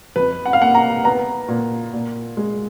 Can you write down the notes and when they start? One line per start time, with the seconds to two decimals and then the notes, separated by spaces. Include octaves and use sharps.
0.16 F2 B4
0.45 F#5
0.53 F5
0.60 A#3 F#5
0.75 A#5
1.04 B3 A#5
1.48 A#2
1.93 A#2
2.37 G#3